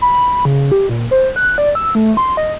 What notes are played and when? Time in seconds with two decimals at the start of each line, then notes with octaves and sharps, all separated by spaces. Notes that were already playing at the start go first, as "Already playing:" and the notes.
0.02 B5
0.45 C#3
0.72 G4
0.89 A#2
1.11 C5
1.36 F#6
1.58 D5
1.75 E6
1.95 A3
2.17 C6
2.37 D#5